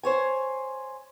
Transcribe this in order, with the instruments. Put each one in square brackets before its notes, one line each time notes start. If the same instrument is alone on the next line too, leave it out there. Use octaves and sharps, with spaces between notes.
[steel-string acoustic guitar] C5 C#5 G#5